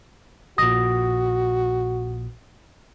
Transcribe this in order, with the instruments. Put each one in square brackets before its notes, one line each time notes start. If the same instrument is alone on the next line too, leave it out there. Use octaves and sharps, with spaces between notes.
[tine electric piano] A#1 A#2 [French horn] F#4 [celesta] D#6 A#6